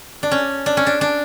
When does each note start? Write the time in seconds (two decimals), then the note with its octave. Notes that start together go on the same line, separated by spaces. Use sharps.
0.23 D4
0.31 C#4
0.66 D4
0.77 C#4
0.87 D4
1.01 D4